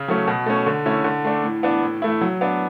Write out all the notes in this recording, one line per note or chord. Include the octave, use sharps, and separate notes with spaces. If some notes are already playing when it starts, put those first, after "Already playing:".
Already playing: C#3
F#3 A3 C#4
B2
A3 C#4
D3
A3 C#4 E4
D3
A3 D4
A2
E3 B3 D4
A2
E3 A3 E4
F#3
B3 D4